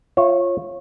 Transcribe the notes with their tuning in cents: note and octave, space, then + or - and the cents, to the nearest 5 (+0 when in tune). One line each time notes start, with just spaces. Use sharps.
F4 +0 C#5 -20 E5 +20